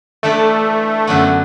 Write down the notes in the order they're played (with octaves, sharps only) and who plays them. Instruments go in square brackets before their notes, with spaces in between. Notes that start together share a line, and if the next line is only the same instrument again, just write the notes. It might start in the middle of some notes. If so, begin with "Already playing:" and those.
[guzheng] E3 D4 A4 E5 [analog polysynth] A3
[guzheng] F#2 D3 F#3 B3 F#4